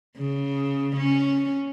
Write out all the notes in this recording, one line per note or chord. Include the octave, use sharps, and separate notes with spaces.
C#3
C#4